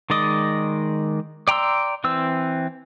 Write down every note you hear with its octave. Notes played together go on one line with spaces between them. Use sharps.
D#3 G#3 D5 D#5
D5 G5 A#5 C6 E6
E3 C4 E6